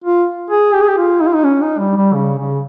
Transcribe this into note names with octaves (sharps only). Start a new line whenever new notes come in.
F4
G#4
G4
G#4
G4
F4
D#4
F4
D#4
C#4
D#4
G3
G3
C#3
C#3